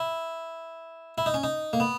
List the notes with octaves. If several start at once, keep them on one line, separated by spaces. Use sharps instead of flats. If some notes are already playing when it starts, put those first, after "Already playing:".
Already playing: E4
E4
D#4
C#4
D#4
A#3
B3